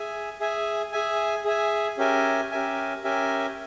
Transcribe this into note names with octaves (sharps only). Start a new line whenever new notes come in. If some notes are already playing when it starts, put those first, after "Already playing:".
Already playing: G#4 E5 G#5
G#4 E5 G#5
G#4 E5 G#5
G#4 E5 G#5
C#4 G4 A#4 E5 G#5
C#4 G4 A#4 E5 G#5
C#4 G4 A#4 E5 G#5